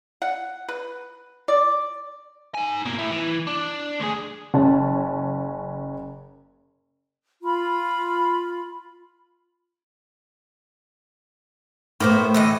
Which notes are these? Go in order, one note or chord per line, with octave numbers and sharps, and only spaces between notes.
F#5
B4
D5
D#4 G#5
B2 A#3
A2 E4
E3
D4
D2 G#4
F#1 C#4 A5
F4 B5
A2 A#3 B3 C5
D3 E3 D#5